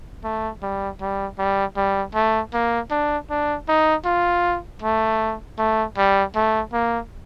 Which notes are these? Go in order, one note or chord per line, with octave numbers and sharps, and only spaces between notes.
A3
G3
G3
G3
G3
A3
A#3
D4
D4
D#4
F4
A3
A3
G3
A3
A#3